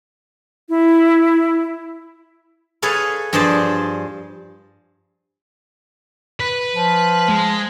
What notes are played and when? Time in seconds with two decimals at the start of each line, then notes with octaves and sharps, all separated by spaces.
0.69 E4
2.82 G#4 A4 B4 C#5 F5
3.33 G2 F3 G#4 C5 D5 A5
6.40 B4
6.75 F3
7.29 G#3